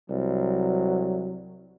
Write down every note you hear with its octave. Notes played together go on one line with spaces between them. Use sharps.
C2 F#3